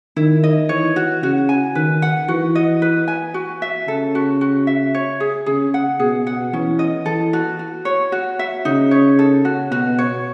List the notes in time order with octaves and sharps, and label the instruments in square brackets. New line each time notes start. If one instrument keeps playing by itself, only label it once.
[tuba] D#3 [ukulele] E4
[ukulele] D#5
[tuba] E3 [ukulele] C#5
[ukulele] F#4
[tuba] C#3 [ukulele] F#4
[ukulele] G#5
[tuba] D#3 [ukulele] B4
[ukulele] F#5
[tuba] E3 [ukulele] F#4
[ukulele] D#5
B4
G#5
F#4
E5
[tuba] C#3 [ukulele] A4
[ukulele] F#4
F#4
E5
C#5
G#4
[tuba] C#3 [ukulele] G#4
[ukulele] F#5
[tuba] B2 [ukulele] G#4
[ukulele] F#5
[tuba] E3 [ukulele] C#4
[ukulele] D#5
[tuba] E3 [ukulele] A4
[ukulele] F#4
F#4
C#5
F#4
E5
[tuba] C#3 [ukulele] D#4
[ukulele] C#5
A4
F#4
[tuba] B2 [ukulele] F#4
[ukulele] C#5